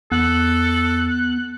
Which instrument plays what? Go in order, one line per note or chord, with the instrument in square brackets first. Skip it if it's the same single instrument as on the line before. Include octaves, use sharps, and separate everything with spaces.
[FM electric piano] E2 [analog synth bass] B3 [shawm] A4 [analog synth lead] F#6